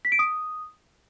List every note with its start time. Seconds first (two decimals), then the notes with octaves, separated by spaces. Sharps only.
0.05 B6
0.12 D7
0.19 D#6